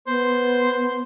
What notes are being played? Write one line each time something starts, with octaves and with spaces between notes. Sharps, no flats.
B3 C5